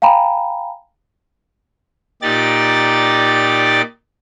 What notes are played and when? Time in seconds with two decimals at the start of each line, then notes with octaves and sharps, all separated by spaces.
0.02 F5 G5 G#5 A#5 B5
2.22 A#2 D#4 G4 D5 A6